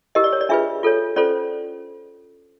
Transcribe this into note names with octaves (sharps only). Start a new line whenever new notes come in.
E4 G4 A#4 D#5
D5
C#5
D5
D4 F4 G#4 B4 E5
F4 A4 C#5
C#4 F4 A4 C5 D5